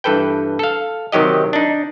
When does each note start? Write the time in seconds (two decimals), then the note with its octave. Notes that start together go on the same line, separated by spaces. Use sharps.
0.04 G2 E3 A4 B4 G5
0.59 A4 F5
1.12 C3 D#3 F#3 G4 D#5
1.53 D4 D#4